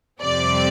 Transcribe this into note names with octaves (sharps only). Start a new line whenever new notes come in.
F2 C3 G3 C4 D5